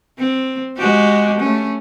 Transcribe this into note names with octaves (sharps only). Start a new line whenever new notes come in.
C4
G#3 F#4 G4
A3 C#4